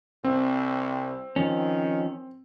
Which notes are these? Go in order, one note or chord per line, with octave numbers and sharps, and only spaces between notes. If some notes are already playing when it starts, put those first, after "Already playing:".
C2 C4
D#3 F3 C#4